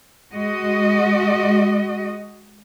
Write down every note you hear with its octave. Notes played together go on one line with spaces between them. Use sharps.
G#3 F#4 D#5